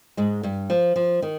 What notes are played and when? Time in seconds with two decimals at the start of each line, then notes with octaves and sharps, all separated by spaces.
0.17 G#2 G#3
0.43 G2 G3
0.70 F3
0.96 F3
1.22 D#3